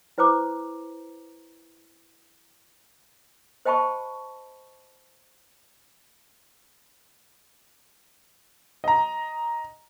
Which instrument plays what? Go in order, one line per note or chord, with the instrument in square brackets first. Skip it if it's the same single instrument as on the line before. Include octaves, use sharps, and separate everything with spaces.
[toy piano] E4 B4 C5 A#5 D6
C5 D#5 G5 A5 B5 C#6
[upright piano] D#5 A#5